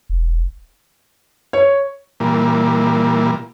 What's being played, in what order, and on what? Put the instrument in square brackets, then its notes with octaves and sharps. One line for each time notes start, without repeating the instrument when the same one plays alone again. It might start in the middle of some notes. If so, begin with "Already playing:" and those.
[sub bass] E1
[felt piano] C#5
[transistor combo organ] A#2 E3 G3 A#3